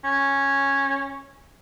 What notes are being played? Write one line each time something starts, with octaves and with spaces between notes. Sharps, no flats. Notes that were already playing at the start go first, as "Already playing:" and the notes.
C#4